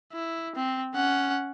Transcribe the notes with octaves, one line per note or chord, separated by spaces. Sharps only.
E4
C4
C#4 F#5